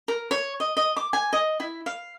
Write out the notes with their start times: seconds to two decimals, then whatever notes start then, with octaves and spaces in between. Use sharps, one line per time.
0.08 A#4
0.31 C#5
0.60 D#5
0.77 D#5
0.97 D6
1.13 G#5
1.33 D#5
1.60 E4
1.86 F5